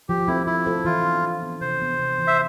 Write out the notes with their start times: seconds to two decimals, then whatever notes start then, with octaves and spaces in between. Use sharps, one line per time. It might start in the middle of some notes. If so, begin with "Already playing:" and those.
0.09 F3 G4
0.27 C4 E4 F4 A4 C5
0.47 F3 E4
0.66 C4 F4 A4 C5
0.85 E3 F4
1.04 B3 D4
1.23 E3
1.42 B3 D4
1.61 C3 C5
1.80 E3 B3 F4
1.99 C3
2.18 E3 B3 F4
2.27 E5